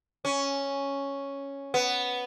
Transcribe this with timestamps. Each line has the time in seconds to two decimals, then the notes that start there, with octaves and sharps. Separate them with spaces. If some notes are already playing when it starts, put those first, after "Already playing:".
0.25 C#4
1.74 B3